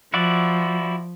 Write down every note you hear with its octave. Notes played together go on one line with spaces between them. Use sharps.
F3 E4 F#4 D5